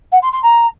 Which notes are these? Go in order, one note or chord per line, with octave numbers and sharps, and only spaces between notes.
F#5
C6
C6
A#5